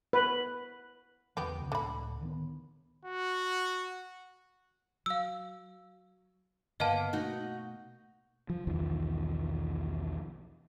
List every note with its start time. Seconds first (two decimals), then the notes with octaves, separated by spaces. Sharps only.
0.13 B4
1.37 E2 D3 F3 B3 G4
1.58 D2 C#3
1.72 C#2 A2 D3 B5
2.21 D3 D#3 B3
3.05 F#4
5.06 F#3 F5 E6
6.80 G2 D3 A#3 B3 D#5 F5 A5
7.13 B2 A3 A#3 D#4 F#4
8.50 F3
8.67 B1 E2 D#3 F3